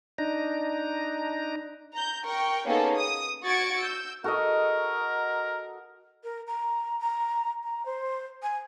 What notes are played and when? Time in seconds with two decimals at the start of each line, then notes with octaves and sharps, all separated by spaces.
0.18 D4 D#4 A#5
1.94 A#5 G6
2.25 A#4 G5 C#6
2.66 A#3 B3 C#4 D#4 G#4 A4
2.97 D#6
3.44 F#4 C#6 G#6 A6 C#7 D7
3.81 E6 G6
4.24 F#4 A4 A#4 D#5
6.24 A#4
6.47 A#5
7.00 A#5
7.63 A#5
7.85 C5
8.42 G#5